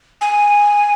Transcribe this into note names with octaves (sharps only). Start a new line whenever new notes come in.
G#5